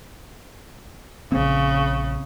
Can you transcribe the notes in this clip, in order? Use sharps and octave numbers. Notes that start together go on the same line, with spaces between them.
A#1 C#3 C4